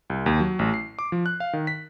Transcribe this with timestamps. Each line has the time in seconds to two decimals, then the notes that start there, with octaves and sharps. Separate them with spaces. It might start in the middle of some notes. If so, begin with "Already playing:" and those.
0.10 C2
0.26 D#2
0.40 F#3
0.59 A1
0.74 C7
0.99 D6
1.12 F3
1.26 F#6
1.40 F5
1.53 D#3
1.67 B6